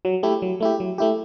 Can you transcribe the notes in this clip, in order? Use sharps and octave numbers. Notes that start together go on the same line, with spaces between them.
F#3
A3 E4 G4
F#3
A3 E4 G4
F#3
A3 E4 G4